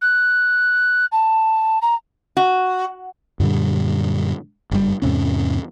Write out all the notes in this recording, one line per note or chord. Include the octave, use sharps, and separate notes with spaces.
F#6
A5
A#5
F#4
F#2 A#2 D3 G3
F#1 G2 G3
E2 G#2 C3 C#4